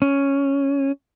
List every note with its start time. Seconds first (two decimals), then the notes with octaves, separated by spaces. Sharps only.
0.02 C#4